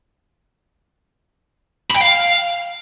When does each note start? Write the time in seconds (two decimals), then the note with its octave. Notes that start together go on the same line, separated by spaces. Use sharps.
1.91 B5
1.96 G5
2.02 F5